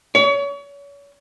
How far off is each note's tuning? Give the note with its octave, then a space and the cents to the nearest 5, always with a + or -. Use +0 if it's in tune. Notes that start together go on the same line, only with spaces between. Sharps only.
C#5 +35